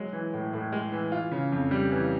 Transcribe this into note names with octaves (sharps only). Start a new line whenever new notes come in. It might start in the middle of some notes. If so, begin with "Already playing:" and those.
Already playing: F#3 G#3
E3
A2
A2
G#3
E3
E3 F4
C#3
F2
G3
E3